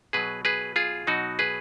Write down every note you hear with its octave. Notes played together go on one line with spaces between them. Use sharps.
B2 F#3 G#4 B4
G#4 B4
F4 G#4
B2 F#3 D#4 F#4
G#4 B4